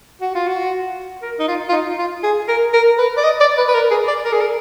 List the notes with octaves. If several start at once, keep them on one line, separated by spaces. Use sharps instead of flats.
F#4
F4
F#4
A#4
D#4
F4
F4
D#4
F4
G#4
A#4
A#4
B4
D5
D#5
D5
B4
B4
A#4
G#4
D5
A#4
G#4
A#4